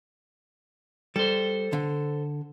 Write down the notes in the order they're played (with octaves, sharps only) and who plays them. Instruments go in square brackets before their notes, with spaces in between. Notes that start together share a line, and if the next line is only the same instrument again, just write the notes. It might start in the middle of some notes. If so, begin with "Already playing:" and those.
[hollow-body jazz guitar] G3 [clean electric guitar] A4 C5
[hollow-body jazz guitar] D3